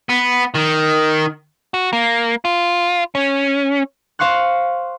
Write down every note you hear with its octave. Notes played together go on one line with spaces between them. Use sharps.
B3
D#3
F#4
A#3
F4
C#4
C5 F5 C6 C#6 F#6